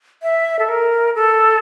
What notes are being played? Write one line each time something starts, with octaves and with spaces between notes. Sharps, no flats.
E5
A4
A#4
A4